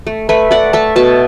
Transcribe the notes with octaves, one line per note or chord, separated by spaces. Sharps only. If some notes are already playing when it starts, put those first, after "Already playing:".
A3
A3 B4 E5
A3 D5 F#5
A3 E5 A5
B2 E5 A5